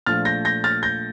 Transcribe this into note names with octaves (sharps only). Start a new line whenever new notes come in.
A#1 A#2 F3 A3 F6 A6
G6 A#6
G6 A#6
F6 A6
G6 A#6